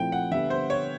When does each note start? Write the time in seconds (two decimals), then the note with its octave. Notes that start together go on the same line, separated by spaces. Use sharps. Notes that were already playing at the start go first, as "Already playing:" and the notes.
Already playing: A#2 F3 A3 C4 E4 G5
0.12 F#5
0.31 D3 G3 B3 E5
0.50 C5
0.70 C#5